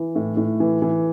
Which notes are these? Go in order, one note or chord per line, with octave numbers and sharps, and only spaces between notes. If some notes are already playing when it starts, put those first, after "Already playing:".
Already playing: E3
A2
A2
E3
E3